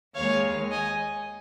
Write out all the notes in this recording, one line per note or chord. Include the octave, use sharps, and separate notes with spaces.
D#2 D#3 G#3 C#5 F5
D#5 G#5